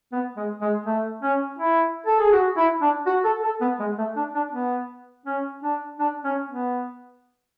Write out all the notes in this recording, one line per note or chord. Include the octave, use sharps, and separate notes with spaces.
B3
G#3
G#3
A3
C#4
E4
A4
G#4
F#4
E4
D4
F#4
A4
A4
B3
G#3
A3
D4
D4
B3
C#4
D4
D4
C#4
B3